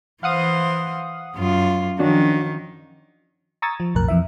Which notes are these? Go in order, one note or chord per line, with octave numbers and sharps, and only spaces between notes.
E3 C5 F5 F#5 D#6
F#2 F4
D#3 F3 C#4 D4 F#4
A#5 C#6 D#6 E6 G#6 A6
F3
B1 F2 A2 A#4 F#6
F2 E3 E5